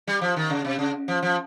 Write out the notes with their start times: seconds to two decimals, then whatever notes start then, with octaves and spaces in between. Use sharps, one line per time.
0.07 G3
0.21 F3
0.36 D#3
0.50 C#3
0.65 C3
0.79 C#3
1.08 F3
1.22 F3